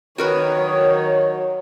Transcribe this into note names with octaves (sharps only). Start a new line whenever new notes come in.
D#3 F#4 A#4 B4 C#5
F#3